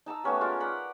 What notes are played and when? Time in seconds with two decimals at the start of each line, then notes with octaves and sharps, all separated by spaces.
0.06 D#4 A5 A#5 E6
0.24 A3 B3 C#4 G4
0.41 G#3 F4 A#4
0.60 A#4 D5 F#5 B5